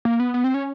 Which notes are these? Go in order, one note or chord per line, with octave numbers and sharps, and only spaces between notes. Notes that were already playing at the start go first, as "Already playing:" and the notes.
A#3
B3
B3
C4
C#4